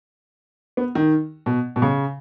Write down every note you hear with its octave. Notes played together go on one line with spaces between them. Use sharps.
B3
D#3
B2
B2
C#3